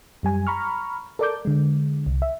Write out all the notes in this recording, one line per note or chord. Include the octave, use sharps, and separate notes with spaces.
F#2 G3 G#5
A#5 B5 C#6 F6
A4 A#4 D5 A5 D6 G6
D3 G#3
C2
E5